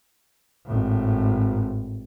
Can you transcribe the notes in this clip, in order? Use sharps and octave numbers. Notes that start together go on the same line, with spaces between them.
G#1 A2